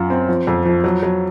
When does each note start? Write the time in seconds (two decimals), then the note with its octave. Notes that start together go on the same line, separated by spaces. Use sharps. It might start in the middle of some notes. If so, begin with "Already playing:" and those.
Already playing: F#2 F4
0.10 C4
0.28 F3
0.47 F2
0.65 F3
0.84 F#3
1.03 F#3